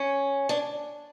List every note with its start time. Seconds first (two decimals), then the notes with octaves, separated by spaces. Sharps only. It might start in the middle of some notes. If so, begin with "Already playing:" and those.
Already playing: C#4
0.49 D4